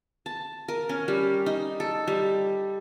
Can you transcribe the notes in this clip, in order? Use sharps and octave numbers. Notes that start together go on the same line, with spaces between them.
A5
A#4
C#4
G3
D#4
A4
G3